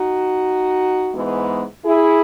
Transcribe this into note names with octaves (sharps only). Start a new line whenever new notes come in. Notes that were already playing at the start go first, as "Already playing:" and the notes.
Already playing: D#4 F#4
G#2 E3 G#3 B3
E4 G#4